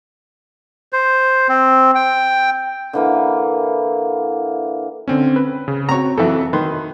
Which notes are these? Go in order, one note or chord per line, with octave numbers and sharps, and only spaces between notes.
C5
C4
G5
D3 E3 A#3
D3 C4 C#4
B4
C#3
C4 F#4 C#5 A#5
F2 E3 F#3 A4 E5
D#3 B4 C6